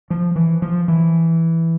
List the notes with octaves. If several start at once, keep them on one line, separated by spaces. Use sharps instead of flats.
F3
E3
F3
E3